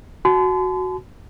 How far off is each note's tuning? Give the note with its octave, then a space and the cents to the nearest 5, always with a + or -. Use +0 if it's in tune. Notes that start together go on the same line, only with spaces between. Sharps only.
F#4 +0 A5 -45 C6 -40